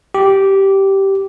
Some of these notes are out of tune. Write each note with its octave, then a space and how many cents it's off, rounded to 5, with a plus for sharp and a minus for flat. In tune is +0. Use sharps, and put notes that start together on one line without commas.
G4 -10